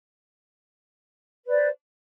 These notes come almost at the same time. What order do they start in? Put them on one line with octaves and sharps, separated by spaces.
B4 D5 C5